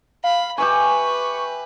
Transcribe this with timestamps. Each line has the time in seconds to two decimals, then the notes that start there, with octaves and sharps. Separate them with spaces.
0.24 F5 B5
0.58 G4 B4 E5 G#5 C#6